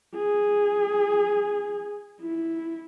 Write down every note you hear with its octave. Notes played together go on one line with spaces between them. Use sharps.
G#4
E4